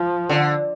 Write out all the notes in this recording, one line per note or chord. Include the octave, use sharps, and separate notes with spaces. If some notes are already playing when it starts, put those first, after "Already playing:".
Already playing: F3
D3